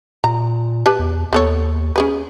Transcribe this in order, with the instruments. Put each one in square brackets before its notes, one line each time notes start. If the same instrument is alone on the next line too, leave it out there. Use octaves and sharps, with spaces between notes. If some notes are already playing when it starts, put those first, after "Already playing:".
[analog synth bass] A#2 [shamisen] A#5
[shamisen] G4 B4 A5
[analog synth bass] E2
[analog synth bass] D#2 [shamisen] B3 A4 C#5
[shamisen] C#4 G#4 B4